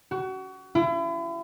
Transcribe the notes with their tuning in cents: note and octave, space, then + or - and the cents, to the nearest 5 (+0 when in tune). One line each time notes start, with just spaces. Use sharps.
F#4 +30
E4 +35